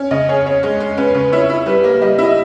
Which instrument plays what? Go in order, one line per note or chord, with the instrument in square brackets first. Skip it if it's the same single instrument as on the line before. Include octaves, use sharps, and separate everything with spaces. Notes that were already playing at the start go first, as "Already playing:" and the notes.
Already playing: [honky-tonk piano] C#4
[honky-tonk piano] C#3 [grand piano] D#5
[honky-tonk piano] G#4 [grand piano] C#5
[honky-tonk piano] C#4 [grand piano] C#5
[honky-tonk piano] G#3 [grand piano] C#5
[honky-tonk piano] G#3 [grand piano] C#5
[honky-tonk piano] C#4 [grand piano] B4
[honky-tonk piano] C#3 [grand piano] B4
[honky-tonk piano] E4 [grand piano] C#5
[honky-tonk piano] E4
[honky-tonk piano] G3 [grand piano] B4
[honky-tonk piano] A#3
[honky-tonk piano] G3 [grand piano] D#5
[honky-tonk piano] E4
[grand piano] D#5